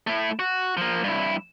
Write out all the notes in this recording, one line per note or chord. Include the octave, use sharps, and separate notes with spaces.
A3 E4
F#4
F3 A#3
G2 E4